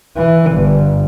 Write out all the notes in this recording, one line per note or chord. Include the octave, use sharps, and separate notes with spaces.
E3
G1